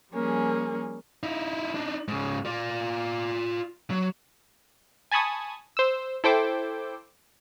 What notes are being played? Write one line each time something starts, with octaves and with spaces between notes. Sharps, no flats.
F3 G3 A#3 C#4 G#4
D#4 E4
D4 D#4
G#2 C#3
F4 D5
F#3
G#5 A5 B5 C#6 D#6 G#6
C5 E6
E4 A4 C5 G5 D6